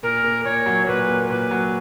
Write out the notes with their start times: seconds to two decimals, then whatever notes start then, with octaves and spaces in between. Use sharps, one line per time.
0.03 A#2 A#4
0.24 A#3
0.45 A#2 C#5
0.66 F#3
0.87 A#2 B4
1.08 A#3
1.29 A#2 B4
1.51 F#3